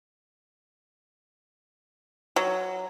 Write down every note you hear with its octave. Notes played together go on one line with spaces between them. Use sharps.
F#3